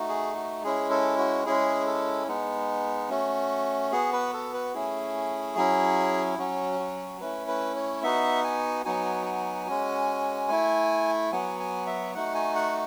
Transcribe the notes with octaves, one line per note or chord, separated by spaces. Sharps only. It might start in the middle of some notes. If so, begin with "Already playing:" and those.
Already playing: A3 D#4 F#4
G#4
F#4
G#3 C#4 E4 G#4
A4
F#4
G#3 C#4 E4 G#4
A4
G#3 B3 D#4
A3 C#4 F#4
B3 F#4 G#4
B4
A4
B4
A3 C#4 E4 G#4
F#3 C#4 E4
F#3 C#4 F#4
F#4
A3 C#4 E4 B4
B4
C#5
B3 D#4 F#4 E5
G#5
F#3 B3 D#4 F#4 G#5
G#5
G#3 C#4 F#4
A3 E4
F#3 B3 F#4 G#5
G#5
E5
A3 D#4 F#4 F#5
G#5
F#5